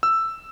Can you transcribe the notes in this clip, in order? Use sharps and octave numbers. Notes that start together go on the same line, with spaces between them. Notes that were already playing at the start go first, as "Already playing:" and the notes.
E6